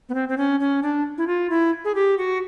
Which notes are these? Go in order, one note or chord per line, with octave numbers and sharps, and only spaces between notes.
B3
C4
C4
C#4
C#4
D4
E4
F4
E4
G#4
G4
F#4